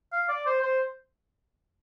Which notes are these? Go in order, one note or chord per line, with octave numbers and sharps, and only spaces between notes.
F5
D5
C5
C5